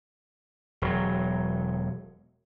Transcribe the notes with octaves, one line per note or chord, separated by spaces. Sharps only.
E1 F#3